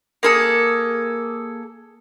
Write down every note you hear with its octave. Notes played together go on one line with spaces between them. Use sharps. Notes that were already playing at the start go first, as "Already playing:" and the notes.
A#3 G#4 A4